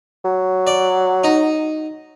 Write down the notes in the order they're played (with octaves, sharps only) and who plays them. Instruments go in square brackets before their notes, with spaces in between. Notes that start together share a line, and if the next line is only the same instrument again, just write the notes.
[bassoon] F#3
[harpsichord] D5
D#4